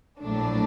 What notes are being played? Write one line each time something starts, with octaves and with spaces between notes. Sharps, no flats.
A#1 A2 F#3 A3 D4